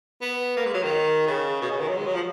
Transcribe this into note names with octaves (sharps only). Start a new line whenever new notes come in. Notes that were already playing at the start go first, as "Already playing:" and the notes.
B3
A#3
G#3
F#3
D#3
C#3
B2
C#3
D#3
F#3
G#3
F#3
F3